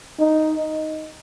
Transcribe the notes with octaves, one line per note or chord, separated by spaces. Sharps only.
D#4